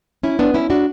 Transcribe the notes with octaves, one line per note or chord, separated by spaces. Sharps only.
C#4 E4
B3 D4
C#4 E4
D4 F#4